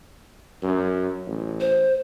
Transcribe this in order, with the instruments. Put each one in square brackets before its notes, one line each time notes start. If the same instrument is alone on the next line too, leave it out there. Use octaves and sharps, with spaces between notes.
[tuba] F#2
A1
[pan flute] C5